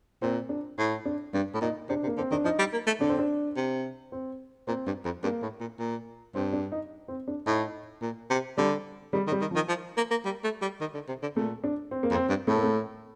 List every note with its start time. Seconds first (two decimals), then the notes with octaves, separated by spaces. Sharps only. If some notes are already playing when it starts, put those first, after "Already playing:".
0.22 A#2 C4
0.49 D4
0.78 A2
1.05 D4
1.33 G2 D4
1.54 A2
1.61 A#2 D#4
1.89 C3 D4
2.03 C3
2.07 A#3
2.17 D3 C4
2.31 D#3 D4
2.44 F3 D#4
2.59 G3
2.72 A#3
2.86 A3
3.00 D3 D4
3.09 C4
3.19 D4
3.56 C3
4.12 C4
4.67 A#2 C4
4.86 G2
5.05 F2
5.23 G2 A#3
5.42 A2
5.60 A#2
5.79 A#2
6.35 G2 C4
6.53 D4
6.72 D#4
7.08 C4
7.28 D4
7.46 A2 D#4
8.02 A#2
8.30 C3
8.58 D3 G3
9.13 D#3 G3
9.27 D#3
9.32 G3
9.41 D#3
9.51 F3
9.55 D#3
9.68 F3
9.97 A#3
10.11 A#3
10.25 G3
10.44 A3
10.62 G3
10.80 D#3
10.94 D3
11.08 C3
11.22 D3
11.36 A#2 A3
11.64 D4
11.91 C4
12.03 A#3
12.10 F2
12.15 C4
12.29 G2
12.47 A2 A3
12.56 A#3
12.63 A3